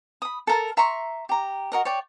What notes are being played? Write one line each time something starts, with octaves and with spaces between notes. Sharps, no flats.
B5 D#6
A4 A#4 A5
E5 A#5 C6 C#6
G4 A#5
F#4 A#4 D#5
C#5 D5 G5